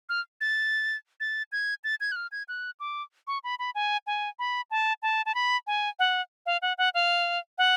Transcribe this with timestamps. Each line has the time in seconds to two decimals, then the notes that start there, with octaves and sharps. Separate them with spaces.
0.09 F6
0.41 A6
1.20 A6
1.52 G#6
1.84 A6
2.01 G#6
2.12 F#6
2.16 F6
2.32 G#6
2.48 F#6
2.80 D6
3.27 C#6
3.44 B5
3.59 B5
3.75 G#5
4.07 G#5
4.39 B5
4.71 A5
5.02 A5
5.26 A5
5.35 B5
5.67 G#5
5.99 F#5
6.46 F5
6.62 F#5
6.78 F#5
6.94 F5
7.58 F#5